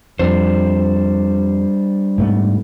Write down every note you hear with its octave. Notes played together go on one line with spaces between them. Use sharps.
F2 G3 D4 C5
G#2 A3 B3